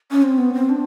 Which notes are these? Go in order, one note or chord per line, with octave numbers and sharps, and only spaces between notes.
C#4
C4
B3
C4
D4